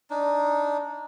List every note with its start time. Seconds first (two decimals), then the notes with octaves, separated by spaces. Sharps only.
0.10 D4 D#4